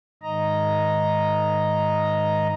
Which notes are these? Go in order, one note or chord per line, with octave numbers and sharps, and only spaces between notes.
G#2 D#3 D#5 A#5